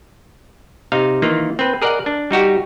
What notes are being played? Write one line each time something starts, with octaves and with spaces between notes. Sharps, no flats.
C3 D#4 F5
D#3 E3 A#3 F4
C4 B4
G#4 A#4 D5 D#5 F#5
D4
G3 D#4 F#4 G4